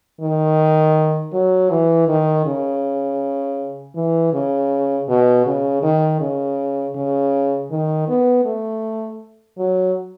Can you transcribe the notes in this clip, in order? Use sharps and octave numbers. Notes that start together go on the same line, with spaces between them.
D#3
F#3
E3
D#3
C#3
E3
C#3
B2
C#3
D#3
C#3
C#3
D#3
B3
A3
F#3